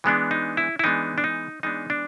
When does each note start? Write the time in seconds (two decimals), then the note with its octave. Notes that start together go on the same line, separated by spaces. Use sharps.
0.04 E3 G#3 B3 D4
0.31 D#4
0.57 E4
0.79 E4
0.84 E3 G#3 B3 D4 D#4
1.18 D4
1.24 D#4
1.63 E3 G#3 B3 D4 D#4
1.90 D4